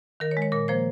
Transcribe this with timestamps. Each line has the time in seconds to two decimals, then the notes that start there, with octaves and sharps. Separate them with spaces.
0.20 D#3 A#4
0.31 C#5
0.37 G#3
0.42 C#5
0.52 A#2 A#4
0.68 F3 A#3 C5